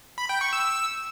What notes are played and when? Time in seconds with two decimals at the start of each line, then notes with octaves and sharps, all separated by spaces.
0.18 B5
0.29 G5
0.41 C#6
0.53 E6